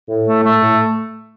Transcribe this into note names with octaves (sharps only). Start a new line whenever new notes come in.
A2
A3
A3
A2